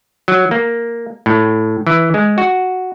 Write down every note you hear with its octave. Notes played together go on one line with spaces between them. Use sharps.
F#3
A#3
A2
E3
G#3
F#4